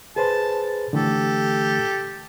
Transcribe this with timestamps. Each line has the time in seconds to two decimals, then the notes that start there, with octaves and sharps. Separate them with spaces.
0.16 G#4 B4 C5 A5
0.93 D3 E3 A3 G4 A4